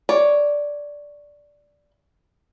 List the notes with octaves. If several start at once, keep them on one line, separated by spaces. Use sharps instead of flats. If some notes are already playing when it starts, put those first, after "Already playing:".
C#5 D5